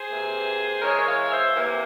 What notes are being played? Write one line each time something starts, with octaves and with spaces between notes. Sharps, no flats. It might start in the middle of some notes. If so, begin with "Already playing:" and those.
Already playing: G#4 C5
C3 E3 A#3
E3 G#3 A#4 C#5
C#5 F5
C5 E5
C3 E3 A#3